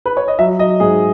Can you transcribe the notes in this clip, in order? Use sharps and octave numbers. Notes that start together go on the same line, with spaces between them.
B4
C#5
D#5
F#3 E5
F#3 D#5
G#2 G#4